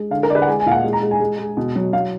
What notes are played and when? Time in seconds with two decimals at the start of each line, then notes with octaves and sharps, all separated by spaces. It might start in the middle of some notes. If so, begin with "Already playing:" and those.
Already playing: G#3
0.11 D3 F5
0.23 A#4
0.29 D3 D5
0.35 B4
0.42 F#5
0.47 G#3 G#5
0.60 G#5
0.66 A#2 F5
0.71 F#5
0.84 G#3
0.93 A#5
1.02 G#3
1.11 G#5
1.20 G#3
1.39 G#3
1.57 B2
1.76 F#3
1.93 F#3 F5